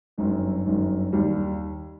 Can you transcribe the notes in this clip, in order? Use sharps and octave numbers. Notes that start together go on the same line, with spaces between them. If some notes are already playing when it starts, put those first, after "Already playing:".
G1 F#2 D#3
G1 F#2 D#3
D#2 D#3 G3